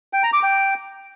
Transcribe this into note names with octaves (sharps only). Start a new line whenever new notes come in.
G5
A#5
D6
G5